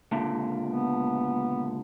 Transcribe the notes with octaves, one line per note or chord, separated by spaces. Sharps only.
C#2 A#2 D3
B3